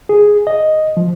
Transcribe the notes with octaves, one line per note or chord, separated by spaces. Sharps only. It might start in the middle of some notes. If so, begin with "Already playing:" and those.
G#4
D#5
F3